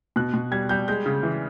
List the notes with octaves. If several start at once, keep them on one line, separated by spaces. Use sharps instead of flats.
B2 F#6
B2
G3 G#6
G3 G6
G#3 G6
C#3
E3